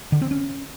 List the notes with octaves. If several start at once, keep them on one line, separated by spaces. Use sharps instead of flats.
D3
C4
C#4